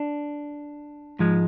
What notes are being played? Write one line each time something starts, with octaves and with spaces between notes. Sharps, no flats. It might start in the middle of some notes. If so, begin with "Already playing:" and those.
Already playing: D4
G#2 F3 G#3